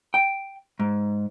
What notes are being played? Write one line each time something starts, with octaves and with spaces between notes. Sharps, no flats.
G5
G#2